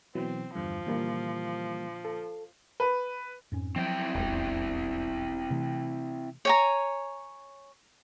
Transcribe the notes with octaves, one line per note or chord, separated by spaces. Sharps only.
B2 E3 F#3 C4
E2 G2 D3 F3
A#2 D3 E3 G3 A#3
A4
B4
F2 G#2 C#4
F3 F#3 C4 E4 G5
E1 B1 F2 G#3
C3 E3 A3
C#5 G#5 A#5